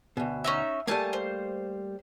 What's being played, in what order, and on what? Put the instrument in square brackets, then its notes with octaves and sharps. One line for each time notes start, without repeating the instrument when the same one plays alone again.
[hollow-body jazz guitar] D2 B2
[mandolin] C#4 D#4 E5
[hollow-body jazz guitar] G3 A3 A#3 [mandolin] G#5 A5
[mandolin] C5